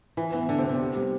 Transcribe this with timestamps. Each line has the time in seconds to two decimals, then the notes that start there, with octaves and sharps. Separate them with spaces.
0.17 E3 E4
0.33 E3 B3
0.49 D3 B3
0.59 C3
0.64 B3
0.69 C3
0.79 G4
0.96 G3